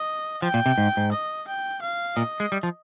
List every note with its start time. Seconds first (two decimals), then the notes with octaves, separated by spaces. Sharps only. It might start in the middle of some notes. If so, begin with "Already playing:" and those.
Already playing: D#5
0.42 F3 G5
0.54 A#2
0.66 C3
0.78 G#2
0.97 G#2
1.12 D#5
1.48 G5
1.82 F5
2.16 A#2 D#5
2.40 G#3
2.52 G3
2.63 F3